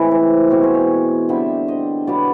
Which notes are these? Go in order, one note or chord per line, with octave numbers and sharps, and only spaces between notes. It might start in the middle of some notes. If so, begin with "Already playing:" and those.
Already playing: A2 E3 G#3 C4
C5
B2 G#3 C4 C#5
C5
C#5
D3 G3 C4 E5
D#5
B2 F#3 B3 D5